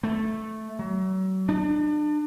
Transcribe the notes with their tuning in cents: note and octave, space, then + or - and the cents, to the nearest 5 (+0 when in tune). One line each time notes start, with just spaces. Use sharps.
A3 -5
F#3 +35
D4 +35